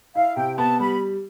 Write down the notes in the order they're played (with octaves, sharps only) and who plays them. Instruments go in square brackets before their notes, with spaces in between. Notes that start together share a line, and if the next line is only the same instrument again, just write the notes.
[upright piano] E4 [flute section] F5
[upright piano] C3 [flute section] G5
[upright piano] B3 [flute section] A5
[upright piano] G3 [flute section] B5